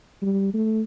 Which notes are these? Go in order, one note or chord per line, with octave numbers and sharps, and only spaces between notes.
G3
A3